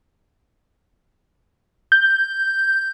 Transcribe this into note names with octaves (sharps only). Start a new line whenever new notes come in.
G6